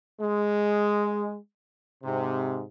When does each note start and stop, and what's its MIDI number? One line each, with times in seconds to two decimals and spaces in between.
0.20 1.36 56
2.02 2.61 44
2.02 2.61 48